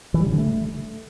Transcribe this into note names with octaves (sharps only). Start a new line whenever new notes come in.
E3
G3
C#3
D3
A3